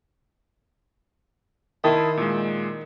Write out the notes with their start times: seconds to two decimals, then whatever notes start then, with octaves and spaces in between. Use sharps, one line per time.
1.84 D#3 E4 A5 C6 D#6
2.17 A#2 G#3